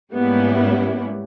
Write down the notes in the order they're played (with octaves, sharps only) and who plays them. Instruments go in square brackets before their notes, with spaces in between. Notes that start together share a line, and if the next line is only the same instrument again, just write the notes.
[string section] G#2 G3 A#3 B3 C#4 E4